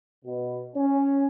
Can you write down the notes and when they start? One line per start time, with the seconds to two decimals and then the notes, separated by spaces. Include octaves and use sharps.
0.24 B2
0.76 C#4